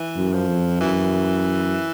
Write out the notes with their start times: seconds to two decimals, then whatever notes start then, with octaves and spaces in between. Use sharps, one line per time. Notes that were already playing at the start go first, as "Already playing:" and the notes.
Already playing: E3
0.17 F#2
0.33 F3
0.48 F2
0.80 F#2 E3